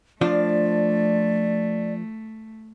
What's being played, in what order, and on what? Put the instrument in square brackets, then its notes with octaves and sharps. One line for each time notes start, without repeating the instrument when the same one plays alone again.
[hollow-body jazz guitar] F3 D4 F4 [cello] A3 [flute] D5